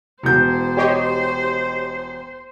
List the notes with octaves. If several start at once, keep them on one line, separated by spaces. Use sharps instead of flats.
E1 C5 G6
G4 C#5 D#5